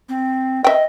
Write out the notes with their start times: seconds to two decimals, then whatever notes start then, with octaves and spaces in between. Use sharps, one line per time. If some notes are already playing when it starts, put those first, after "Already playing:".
0.09 C4
0.64 D#5 E5 G5